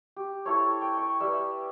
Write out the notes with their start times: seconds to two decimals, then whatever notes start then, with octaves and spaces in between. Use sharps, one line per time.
0.16 G4
0.45 E4 A4 C5 C#5
0.81 G5
0.98 C#6
1.20 G3 B4 E5